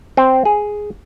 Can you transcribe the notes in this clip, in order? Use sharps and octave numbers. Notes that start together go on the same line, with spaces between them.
C4
G#4